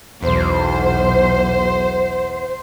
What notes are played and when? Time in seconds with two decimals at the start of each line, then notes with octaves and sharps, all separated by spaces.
0.23 B1 E2 C5